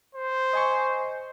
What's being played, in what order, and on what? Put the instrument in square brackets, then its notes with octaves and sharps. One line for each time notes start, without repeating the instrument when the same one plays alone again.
[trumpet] C5
[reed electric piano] D#5 G#5 C#6